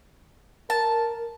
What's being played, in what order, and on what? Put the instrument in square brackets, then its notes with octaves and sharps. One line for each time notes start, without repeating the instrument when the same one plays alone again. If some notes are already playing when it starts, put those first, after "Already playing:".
[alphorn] A#4 [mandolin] A5